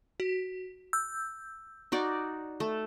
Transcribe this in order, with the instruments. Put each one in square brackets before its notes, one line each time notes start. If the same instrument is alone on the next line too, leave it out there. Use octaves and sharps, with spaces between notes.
[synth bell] F#4
E6 G6
[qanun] D#4 F#4 D5
A3